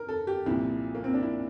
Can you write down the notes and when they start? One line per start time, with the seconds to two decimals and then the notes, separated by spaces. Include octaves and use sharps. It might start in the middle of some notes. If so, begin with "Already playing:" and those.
Already playing: A#4
0.09 A4
0.27 G4
0.46 C2 A#2 F3 E4
0.95 A#3
1.04 C4
1.14 D4
1.23 E4